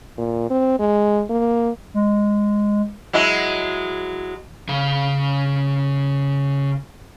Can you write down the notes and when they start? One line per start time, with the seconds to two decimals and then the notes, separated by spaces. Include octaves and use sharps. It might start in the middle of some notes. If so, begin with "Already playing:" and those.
0.18 A#2
0.50 C4
0.79 G#3
1.30 A#3
1.94 G#3
3.13 F#3 G#3 E4
4.69 C#3 F5